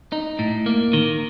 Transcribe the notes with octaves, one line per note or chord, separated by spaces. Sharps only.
D#4
A2
A#3
D#3